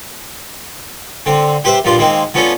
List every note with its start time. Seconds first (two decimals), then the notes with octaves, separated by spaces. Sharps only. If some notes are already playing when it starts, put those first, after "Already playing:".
1.26 D3 C4
1.65 G4 B4 C5 E5
1.84 A#1 G2 F3 F4 D5 C6
1.98 D#3 G#3 A#3 C4
2.34 F3 B3 C#4 D4 A4